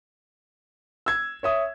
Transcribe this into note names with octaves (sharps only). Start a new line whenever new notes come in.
E6 G#6
C#5 E5 D#6